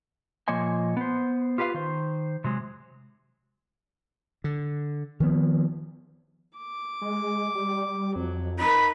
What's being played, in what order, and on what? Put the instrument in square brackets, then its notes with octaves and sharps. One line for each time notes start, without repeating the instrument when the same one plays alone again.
[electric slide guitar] A#2 F3 A#3 C#5 D#5 G#5
B3 C5
F4 G4 B4 E5 F5
D#3 C5
C3 F#3 G#3
[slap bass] D3
D#3 F3 B3
[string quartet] D6
[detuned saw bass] G#3
G3
[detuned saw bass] F2 [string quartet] F#3
[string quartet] D#4 A#4 [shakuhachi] B5